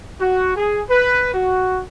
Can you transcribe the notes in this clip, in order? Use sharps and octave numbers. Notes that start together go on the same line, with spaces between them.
F#4
G#4
B4
F#4